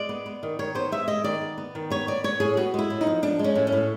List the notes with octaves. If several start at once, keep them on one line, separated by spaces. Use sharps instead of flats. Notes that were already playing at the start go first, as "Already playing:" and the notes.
Already playing: G#3 D5
B3
B3
D#3
D#3 C#5
B3 C5
G#3 E5
G#3 D#5
D#3 D5
B3
B3
D#3
B3 C#5
B3 D5
B3 C#5
A2 G#4
B3 F#4
G#3 E4
A2
D#4
F3
F3 D4
G#3
C#4
A2
C#4
A2